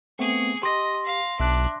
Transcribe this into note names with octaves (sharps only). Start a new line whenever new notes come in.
A3 B3 C4 G#4 C#6
G4 D#5 C6 A#6
F5
B1 D4 E5 F#6